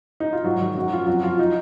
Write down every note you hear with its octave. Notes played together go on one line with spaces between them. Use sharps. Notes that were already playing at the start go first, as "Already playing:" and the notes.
D#4
F4
G#2 F#3 F#4
D#3 F#3
F#2 F#3 F#4
F3 F4
F2 F#3 F#4
F3 F4
D#4